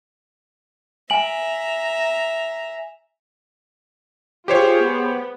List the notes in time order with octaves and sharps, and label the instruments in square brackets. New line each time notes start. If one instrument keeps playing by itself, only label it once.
[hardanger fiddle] E5 A#5 [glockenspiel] G#5 F#7
[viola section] F4 G#4 [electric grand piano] G4 C5 C#5
[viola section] B3